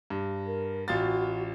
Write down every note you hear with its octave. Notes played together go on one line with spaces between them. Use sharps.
G2
A#4
A1 F4 F#4 A6